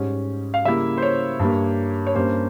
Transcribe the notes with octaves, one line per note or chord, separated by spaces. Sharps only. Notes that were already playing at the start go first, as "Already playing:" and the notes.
Already playing: G#2 G3 C#4
F5
C#3 G3 A#3 E4 E5
C5
C#5
G2 G3 A#3
C#5
G2 G3 A#3 C#4 C5